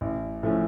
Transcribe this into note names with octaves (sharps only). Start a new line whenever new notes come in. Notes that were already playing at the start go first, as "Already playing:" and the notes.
A1
A2 F3 A3 C#4